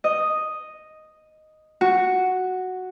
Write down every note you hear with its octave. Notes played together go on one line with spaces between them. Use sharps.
D#5
F#4